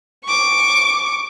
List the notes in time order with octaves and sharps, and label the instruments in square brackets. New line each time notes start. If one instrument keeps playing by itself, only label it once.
[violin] C#6 D6